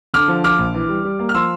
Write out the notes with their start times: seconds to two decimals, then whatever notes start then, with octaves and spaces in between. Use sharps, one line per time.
0.14 D3 D6 F6
0.28 F3
0.44 F3 D6 F6
0.59 A#1
0.74 E3
0.89 G3
1.04 G3
1.19 A#3
1.29 F6
1.34 F3 C6 E6